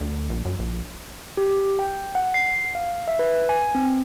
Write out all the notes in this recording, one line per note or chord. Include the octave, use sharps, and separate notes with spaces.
D2
A#1
F#2
A#1
G4
G5
F#5
C7
F5
E5
B4
G#5
C4